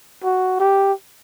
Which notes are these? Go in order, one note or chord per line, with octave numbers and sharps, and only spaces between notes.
F#4
G4